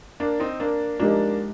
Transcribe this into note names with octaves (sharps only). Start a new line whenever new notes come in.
A#3 D4
C4 D#4
A#3 D4
F3 G#3 A#3 D4 D#4 G4